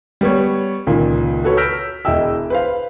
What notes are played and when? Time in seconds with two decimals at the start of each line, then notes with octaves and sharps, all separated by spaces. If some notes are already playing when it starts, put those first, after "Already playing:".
0.21 G3 B3 C#5
0.87 C#2 A#2 D#3
1.44 F#4 A4 B4 C#5
1.57 E6 F6 G6 A#6 B6 D7
2.05 E1 E4 D#5 G5 E6
2.50 B4 C5 F5